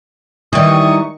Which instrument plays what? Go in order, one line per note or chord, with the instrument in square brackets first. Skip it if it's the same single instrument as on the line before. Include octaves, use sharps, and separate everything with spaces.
[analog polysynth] D#3 C#6 [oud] E3 G3 [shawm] D#6